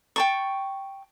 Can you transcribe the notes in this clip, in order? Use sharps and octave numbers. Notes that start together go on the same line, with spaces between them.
G5 A5 C#6